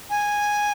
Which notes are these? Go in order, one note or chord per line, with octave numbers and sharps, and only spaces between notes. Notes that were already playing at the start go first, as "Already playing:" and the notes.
G#5